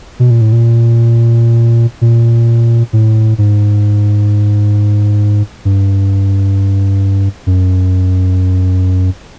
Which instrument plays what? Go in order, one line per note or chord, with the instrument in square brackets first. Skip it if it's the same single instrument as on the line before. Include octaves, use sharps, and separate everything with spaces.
[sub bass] B2
A#2
A2
A#2
A#2
A2
G#2
G2
F#2